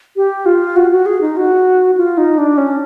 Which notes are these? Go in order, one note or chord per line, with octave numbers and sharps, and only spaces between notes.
G4
F4
F#4
F#4
G#4
D#4
F#4
F4
D#4
D4
C#4